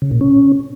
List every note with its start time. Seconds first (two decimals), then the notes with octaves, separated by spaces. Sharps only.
0.02 C#3
0.11 A#2
0.21 C#4